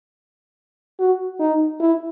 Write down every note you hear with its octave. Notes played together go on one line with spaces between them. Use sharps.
F#4
D#4
E4